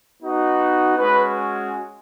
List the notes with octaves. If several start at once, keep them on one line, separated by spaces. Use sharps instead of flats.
B3 D#4 F#4
G#3 C#4 F#4 B4